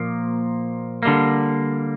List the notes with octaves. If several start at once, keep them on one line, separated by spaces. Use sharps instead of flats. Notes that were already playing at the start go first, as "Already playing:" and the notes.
Already playing: A#2 F3 A#3
D3 G3 A#3